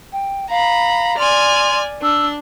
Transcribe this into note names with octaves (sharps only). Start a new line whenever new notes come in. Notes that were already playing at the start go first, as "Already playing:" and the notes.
G5
F5 A#5 B5
D5 G#5 C6 F6
D4 E6